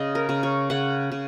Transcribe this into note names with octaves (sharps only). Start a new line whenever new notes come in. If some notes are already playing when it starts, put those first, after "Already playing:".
Already playing: C#3 D#5
A#4
C#3
C#5
C#3 F#5
C#3